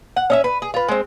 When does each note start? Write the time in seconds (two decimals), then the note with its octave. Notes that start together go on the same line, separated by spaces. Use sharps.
0.16 F#5
0.30 C#4 D#5 E5
0.44 B4
0.62 G#4
0.74 F4 B4
0.88 G#3 C4